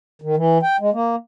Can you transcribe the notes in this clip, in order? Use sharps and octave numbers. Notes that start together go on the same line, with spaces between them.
D#3
E3
G5
G#3
A#3